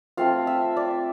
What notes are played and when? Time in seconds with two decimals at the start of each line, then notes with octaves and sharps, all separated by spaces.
0.17 A3 C4 F4 F5
0.47 E5
0.77 D5